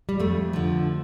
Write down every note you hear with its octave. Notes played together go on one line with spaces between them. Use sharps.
G3
F2 A3
D3 F3